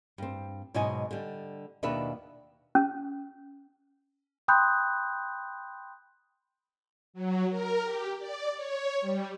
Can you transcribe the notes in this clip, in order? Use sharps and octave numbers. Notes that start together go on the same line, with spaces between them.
G2 C4
G#2 B2 F#3 B3 D#5 G#5
D3 G3
D#2 B2 D4 F#4 B4 E5
C#4
G5 B5 C6 D#6 F#6 G6
F#3
A#4
G4
D5
C#5
G3